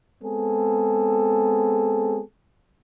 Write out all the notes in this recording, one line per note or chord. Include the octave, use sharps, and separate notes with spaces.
G#3 B3 C4 G#4 A4